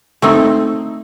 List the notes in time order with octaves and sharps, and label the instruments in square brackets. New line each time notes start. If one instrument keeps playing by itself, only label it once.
[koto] A3 C4 D#4